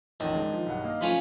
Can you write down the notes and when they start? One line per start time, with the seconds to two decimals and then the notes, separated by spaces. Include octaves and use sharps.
0.20 A1 F2 D#3
0.35 G#3 D4
0.53 F3
0.66 B1 G2 F#5
0.84 A#3 D#5 F5
1.01 F3 A3 C#4 F4 B5